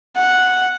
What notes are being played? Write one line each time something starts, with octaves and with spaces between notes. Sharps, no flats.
F#5